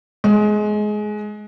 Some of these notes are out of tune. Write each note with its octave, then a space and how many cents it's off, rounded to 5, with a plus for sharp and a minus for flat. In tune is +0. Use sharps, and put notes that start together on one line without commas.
G#3 +20